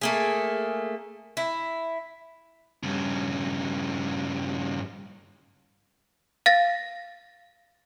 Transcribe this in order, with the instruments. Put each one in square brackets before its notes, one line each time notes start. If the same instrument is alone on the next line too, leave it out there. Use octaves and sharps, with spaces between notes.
[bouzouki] A3 A#3 G#4
E4
[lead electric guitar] G2 C#3
[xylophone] F5 A6 A#6